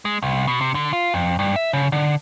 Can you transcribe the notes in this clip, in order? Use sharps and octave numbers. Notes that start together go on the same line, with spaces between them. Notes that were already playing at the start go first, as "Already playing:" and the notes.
G#3
C2
B2
C3
D3
F4
F2
G2
E5
C#3
D3